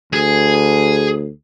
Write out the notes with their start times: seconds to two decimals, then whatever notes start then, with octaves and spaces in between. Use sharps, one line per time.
0.13 D2 G#4